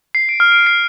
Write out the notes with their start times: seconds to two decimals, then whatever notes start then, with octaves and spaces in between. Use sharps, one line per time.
0.15 C7
0.29 D7
0.40 F6
0.52 D7
0.67 C7